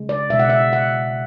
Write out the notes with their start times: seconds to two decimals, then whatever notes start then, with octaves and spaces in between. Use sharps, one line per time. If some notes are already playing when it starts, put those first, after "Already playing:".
Already playing: C#3 G#3
0.09 D5
0.30 B2 G#3 E5
0.39 F#5
0.49 E5
0.73 F#5